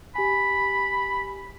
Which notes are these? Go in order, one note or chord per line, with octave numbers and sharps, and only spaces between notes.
G4 G#5 B5